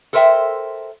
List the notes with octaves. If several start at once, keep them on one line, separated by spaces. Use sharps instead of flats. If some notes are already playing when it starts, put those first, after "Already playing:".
A4 A#4 C5 D#5 E5 G5